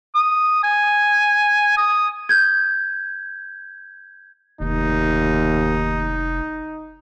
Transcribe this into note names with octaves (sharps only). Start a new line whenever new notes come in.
D#6
G#5
D#6
G6 G#6
F1 D#2 D#4